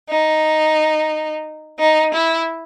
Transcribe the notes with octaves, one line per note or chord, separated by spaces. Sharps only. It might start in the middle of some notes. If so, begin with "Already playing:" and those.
D#4
D#4
E4